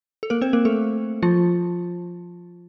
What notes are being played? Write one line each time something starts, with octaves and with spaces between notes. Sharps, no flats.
A4
A#3 A#4
C4 C5
A#3 A#4
A3 A4
F3 F4